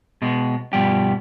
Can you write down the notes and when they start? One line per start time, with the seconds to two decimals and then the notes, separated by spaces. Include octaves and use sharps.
0.22 B2 G#3
0.73 G2 B2 F3 G3 G4